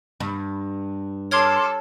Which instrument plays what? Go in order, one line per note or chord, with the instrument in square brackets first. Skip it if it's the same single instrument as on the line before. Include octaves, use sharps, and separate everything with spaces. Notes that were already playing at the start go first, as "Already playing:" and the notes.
[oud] G2
[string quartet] A4 [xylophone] C#5 G#6 G7 [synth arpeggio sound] C6 D6 F6